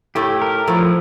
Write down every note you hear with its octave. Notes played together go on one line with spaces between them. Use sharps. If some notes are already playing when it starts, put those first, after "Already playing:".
A2 A3 G4
A#4
A2 F3 A3